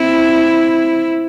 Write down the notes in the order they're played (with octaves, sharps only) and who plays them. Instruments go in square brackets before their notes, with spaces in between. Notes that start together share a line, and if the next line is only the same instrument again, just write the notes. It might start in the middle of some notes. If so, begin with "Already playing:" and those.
Already playing: [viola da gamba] C4 E4